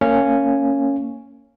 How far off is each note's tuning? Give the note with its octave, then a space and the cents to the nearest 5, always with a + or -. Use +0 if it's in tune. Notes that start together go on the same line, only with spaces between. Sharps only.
A#3 -20 C#4 +0